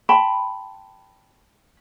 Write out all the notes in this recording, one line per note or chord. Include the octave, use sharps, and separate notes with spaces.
G5 A5 B5 C6